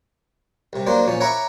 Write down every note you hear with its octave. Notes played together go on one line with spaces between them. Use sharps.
C2 C3
F#3 A#3 D4 C5
A#2 F3 C#4
C#5 E5 F#5 A#5 B5 D6